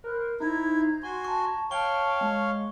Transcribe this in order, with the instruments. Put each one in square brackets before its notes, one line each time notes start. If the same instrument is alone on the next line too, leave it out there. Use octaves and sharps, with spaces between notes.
[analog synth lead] A#4 [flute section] C5 B5 F#6
[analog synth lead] D#4 [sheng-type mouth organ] E4 [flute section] C5 A#5 G#6
[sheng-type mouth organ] F#4 G#5 [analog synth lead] C6
[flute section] A5 A#5 [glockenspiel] C#6
[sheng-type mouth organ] C#5 F5 [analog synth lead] G5 [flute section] A5 [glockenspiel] C#6 G7
[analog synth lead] G#3